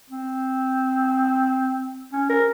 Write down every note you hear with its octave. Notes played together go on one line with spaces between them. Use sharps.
C4
C#4
A#4